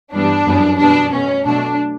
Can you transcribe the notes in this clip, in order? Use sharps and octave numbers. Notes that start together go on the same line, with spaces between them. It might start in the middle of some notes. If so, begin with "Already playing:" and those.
G2 E3 G3 B3 D4
F#2 E3 G3 B3
B2 G3 B3 D4
B2 A3 C#4
B2 F#3 A3 D4